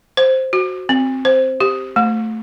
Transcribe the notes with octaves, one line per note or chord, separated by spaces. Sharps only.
C5
F#4
C4
C5
G4
A3